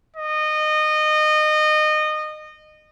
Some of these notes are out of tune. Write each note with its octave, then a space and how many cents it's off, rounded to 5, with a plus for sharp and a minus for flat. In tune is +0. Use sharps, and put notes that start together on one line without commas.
D#5 -25